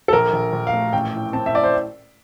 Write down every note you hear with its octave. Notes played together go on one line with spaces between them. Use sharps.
A4
A#1 A#4
A#1
A#1
F5
A3
A1 G5
A2
C4 A5
E5
A2 D5
C5